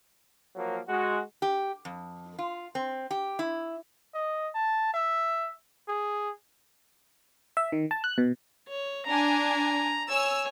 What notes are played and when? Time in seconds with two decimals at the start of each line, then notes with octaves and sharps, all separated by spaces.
0.55 F3 F#3 A#3
0.89 G#3 F#4
1.42 G4
1.85 F2
2.39 F4
2.75 C4
3.11 G4
3.39 E4
4.14 D#5
4.54 A5
4.94 E5
5.88 G#4
7.57 E5
7.72 D#3
7.91 A5
8.04 F#6
8.18 B2
8.68 C#5
9.06 D4 G#5 A#5
10.10 C#5 G#5 E6